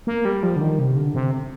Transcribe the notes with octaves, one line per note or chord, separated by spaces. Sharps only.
A#3
G3
F3
D3
D#3
C3
D3
C3